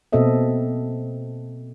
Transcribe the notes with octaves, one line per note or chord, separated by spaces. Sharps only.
B2 A#3 C4 A4 D#5 E5